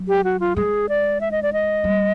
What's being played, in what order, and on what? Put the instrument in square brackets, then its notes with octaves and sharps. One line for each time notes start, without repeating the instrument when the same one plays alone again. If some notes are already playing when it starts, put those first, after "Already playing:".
Already playing: [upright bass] F#3
[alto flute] G4
F#4
F4
[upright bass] G#3 [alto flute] G#4
[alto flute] D5
E5
D#5
D5
D#5
[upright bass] G3